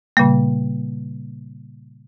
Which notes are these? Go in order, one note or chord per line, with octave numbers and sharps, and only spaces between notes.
A#2 C#3 G3 A#3